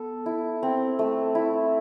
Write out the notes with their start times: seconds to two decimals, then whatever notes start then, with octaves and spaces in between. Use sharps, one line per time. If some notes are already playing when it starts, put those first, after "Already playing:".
Already playing: B3 A4
0.26 E4
0.63 C4
0.99 A3
1.35 E4